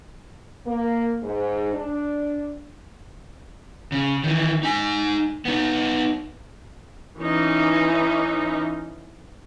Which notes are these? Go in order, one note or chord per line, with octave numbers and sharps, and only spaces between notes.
A#3
G#2
D4
C#3
D#3 E3
D#4 G#5
B3 D#4
E3 C#4 D#4